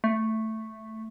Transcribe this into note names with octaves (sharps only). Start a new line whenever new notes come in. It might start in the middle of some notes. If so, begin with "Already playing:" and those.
A3